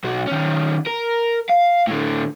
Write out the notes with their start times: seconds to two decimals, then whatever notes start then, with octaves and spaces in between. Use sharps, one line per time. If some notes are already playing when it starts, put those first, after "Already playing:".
0.04 B1 F#4
0.27 D#3 C#4
0.87 A#4
1.50 F5
1.87 A2 D3